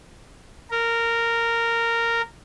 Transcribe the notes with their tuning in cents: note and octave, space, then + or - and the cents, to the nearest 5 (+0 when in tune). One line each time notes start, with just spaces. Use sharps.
A#4 -10